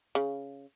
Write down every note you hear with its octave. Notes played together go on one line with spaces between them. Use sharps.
C#3